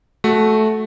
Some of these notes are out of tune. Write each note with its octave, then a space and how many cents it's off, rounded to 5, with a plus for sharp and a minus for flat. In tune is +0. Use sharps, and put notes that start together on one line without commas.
A3 -15 F#4 +0